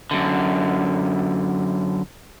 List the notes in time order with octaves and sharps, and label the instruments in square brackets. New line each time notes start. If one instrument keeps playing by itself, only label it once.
[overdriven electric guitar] F#2 D3